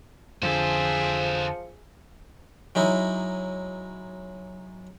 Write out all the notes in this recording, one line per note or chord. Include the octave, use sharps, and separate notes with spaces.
F2 D3 F3 G#4 A4 C5 E5
F#3 G#3 D#4 E4